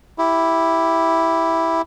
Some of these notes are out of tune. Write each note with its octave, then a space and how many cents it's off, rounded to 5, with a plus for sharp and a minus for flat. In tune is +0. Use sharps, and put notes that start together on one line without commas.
E4 +0 G4 +0